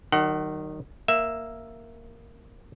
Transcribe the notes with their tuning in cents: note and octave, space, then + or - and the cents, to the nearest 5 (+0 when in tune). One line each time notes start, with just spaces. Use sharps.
D#3 -15 F#3 +35 F#5 +35
A#3 -5 E5 +0